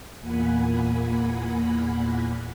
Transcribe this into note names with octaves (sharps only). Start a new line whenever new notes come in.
E2 A#2 A#3 F#5 G#5 B5